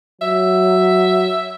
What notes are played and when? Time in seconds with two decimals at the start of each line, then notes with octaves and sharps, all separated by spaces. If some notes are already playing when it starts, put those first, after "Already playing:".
0.21 F#3 E5